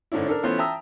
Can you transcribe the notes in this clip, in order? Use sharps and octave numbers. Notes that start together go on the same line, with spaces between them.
G#2 D3 C#4 D4 E4
D4 A4 A#4
E3 A3 B3 C#4 F4 C5
E5 G5 A5 A#5 D#6 E6